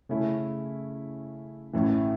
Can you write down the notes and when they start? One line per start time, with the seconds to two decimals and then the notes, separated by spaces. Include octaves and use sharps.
0.09 C#3 A3 C#4 E4
1.73 A1 A2 E3